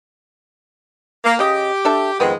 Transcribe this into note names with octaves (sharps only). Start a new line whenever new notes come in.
A#3
C#3 G4 D#5
D4 A4 E5
F2 D#3 G#3 B3 C4